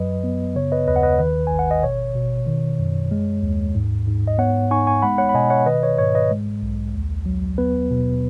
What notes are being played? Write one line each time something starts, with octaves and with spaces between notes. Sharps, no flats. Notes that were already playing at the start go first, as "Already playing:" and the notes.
Already playing: F#2 F#3 B4 D#5
B3
C#3 C#5
B4 D#5
D#2 B4 D#5
F#5
B4 D#5
D#3 B4
G#1 G#5
F#5
D#5
B2 C#5
B2
D#3
F#2
G#3
D#2
G#2
G#2
D#5
B3 C#5 F#5
D#4 G#5 C#6
G#5 C#6
G#3 F#5 B5
C#5 F#5
B5
B2 D#5 G#5
C#5 F#5
D#3 B4 D#5
C#5
G#2 C#5
B4 D#5
G#3
B1
D#2
F#3
B3 B4
B2